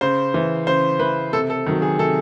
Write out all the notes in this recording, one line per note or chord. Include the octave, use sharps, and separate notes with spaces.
C#3 C5
E3
C#3 C5
E3 B4
C3 A4
A4
D#3 F#3
G#4
C3 A4